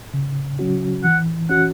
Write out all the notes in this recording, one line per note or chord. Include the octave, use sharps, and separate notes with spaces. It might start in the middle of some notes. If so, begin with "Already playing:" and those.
C#3
F#3 C#4 F#4
E3 F#5
C#4 F#4 F#5